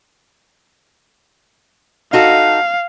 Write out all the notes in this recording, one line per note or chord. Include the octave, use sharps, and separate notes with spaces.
D#4 F#4 A4 F5